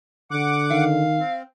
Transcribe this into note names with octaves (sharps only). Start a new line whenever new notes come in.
D3 F#5 D6
D#3 F5
C4